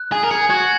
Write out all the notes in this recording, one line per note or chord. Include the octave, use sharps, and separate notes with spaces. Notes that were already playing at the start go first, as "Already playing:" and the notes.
Already playing: F#6
G#4 G#5
A#4
G#4 C#7
F#4 G#6